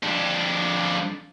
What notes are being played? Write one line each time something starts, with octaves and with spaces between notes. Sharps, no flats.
F2 D4